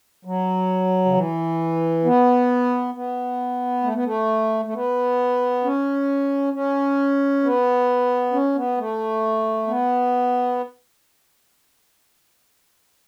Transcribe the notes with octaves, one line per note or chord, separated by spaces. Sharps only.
F#3
C#3
E3
B3
B3
A3
B3
A3
A3
B3
C#4
C#4
B3
C#4
B3
A3
B3